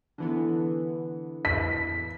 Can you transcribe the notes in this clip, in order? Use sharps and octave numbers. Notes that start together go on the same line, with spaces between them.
D3 E3 B3
B6